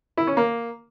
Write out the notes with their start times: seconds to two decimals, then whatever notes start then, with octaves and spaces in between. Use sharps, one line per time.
0.17 E4
0.27 C#4
0.37 A#3